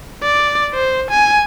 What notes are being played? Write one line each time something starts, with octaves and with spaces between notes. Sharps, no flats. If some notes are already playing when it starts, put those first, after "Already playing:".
D5
C5
G#5